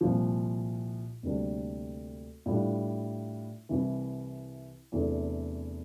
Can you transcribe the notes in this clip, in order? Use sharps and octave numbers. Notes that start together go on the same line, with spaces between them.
C2 A#2 F3
D2 C3 G3 A#3 D4
A2 G3 D4 F4
C2 C3 E3
E2 C3 E3 A3 D4